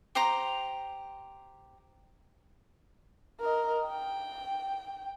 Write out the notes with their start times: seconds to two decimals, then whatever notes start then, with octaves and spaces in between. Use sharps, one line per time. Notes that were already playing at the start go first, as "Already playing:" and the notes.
0.15 G4 C5 A#5
3.41 A#4 D#5
3.87 G5